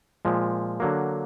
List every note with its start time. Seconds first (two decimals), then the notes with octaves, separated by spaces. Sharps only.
0.25 A#2 F3 G#3
0.80 D3 F#3 A#3